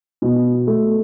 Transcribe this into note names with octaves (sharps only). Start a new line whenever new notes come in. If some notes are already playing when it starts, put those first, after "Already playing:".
B2
A3